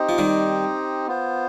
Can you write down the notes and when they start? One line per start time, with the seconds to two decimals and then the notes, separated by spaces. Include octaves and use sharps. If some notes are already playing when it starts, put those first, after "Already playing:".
Already playing: C4 D#4 G4 C5 D#5
0.09 F3
0.18 D#3 G3
1.08 B3 F4 C5